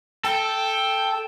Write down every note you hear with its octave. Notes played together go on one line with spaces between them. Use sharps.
A4 G5